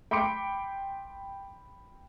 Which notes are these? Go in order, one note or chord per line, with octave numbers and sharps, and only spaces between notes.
G5 B5 C6 D6 C#7 D7